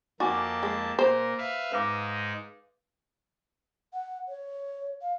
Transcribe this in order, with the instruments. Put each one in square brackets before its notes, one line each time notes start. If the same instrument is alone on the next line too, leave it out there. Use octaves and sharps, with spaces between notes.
[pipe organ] F2 A#3 A5 [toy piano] D#4 G#5 D6 [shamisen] F#4
[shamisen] G#3
[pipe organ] A#2 A#4 [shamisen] C5
[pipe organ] B4 E5 F5
[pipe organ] G#2 G#3 D#4 [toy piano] B4 F5 D6
[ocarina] F#5
C#5
F5